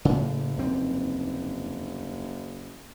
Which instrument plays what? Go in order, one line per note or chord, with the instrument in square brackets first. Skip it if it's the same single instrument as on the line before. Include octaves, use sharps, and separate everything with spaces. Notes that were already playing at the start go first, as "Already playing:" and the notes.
[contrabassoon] F#1 [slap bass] A2 C#3
[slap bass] F1 D#2 C4